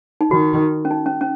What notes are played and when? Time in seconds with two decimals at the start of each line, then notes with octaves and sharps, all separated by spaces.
0.21 D#4
0.31 D#3 F#4
0.85 C#4
0.91 D#4
1.06 C#4
1.21 C#4